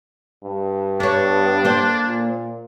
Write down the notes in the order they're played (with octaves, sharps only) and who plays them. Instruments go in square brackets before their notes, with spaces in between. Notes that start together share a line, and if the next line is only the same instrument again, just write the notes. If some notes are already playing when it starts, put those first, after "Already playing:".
[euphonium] G2
[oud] B3 C#5 [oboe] D4
[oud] A#3 C5
[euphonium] A#2